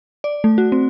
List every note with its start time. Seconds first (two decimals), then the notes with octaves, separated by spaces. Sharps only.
0.24 D5
0.44 A3
0.58 F#4
0.72 C4